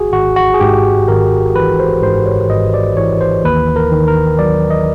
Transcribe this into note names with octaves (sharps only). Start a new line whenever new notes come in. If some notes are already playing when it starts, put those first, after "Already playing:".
Already playing: G#1 F#4 G#4
G#1 F#4
F#4
G#4
G#2 G4
G#1 A#4
E3 B4
C5
G#2 C5
C#5
G#1 D#5
D5
E3 C#5
C5
D#2 B4
A#4
D#3
A#4
F#3 D5
D#5